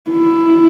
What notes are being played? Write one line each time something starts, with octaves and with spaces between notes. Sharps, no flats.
E4